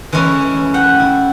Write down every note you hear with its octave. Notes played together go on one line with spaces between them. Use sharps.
E3 G#3 A3 C#4 E4
F#5 G5
E4